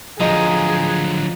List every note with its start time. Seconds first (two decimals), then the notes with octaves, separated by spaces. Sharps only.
0.20 D3 F3 F#3 G#4 D#5 A#5